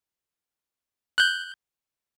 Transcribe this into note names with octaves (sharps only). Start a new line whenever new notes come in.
F#6 G6